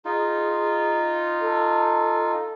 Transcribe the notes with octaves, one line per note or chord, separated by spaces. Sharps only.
D#4 F4 G#4
A4